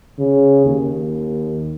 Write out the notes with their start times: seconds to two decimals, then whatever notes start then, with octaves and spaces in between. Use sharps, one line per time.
0.19 C#3
0.65 D#2